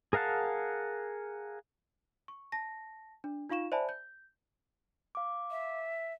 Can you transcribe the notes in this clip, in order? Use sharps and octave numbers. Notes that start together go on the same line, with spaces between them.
G#4 A#4 F5 F#5 A5
C#6
A5 A#6
D4
D#4 F4 F5 C#6 E7
C5 D5 E5 G#5 A5 B5
G6
F5 D6
E5